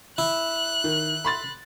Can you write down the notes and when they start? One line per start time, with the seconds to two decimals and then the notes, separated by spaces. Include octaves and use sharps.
0.18 E4 F#6
0.84 D#3
1.25 B5 C6 A6